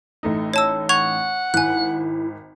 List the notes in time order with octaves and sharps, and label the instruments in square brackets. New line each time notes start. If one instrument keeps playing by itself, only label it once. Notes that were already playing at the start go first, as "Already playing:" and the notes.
[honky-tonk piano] A1 A3 D#4
[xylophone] C#5 A5 E6
[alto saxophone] F#5 [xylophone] C#6 G#6 F7
[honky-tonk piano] G#1 [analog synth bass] E4 [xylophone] G#5 F#6